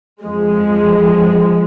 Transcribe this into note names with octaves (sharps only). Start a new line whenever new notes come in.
F2 F3 G#3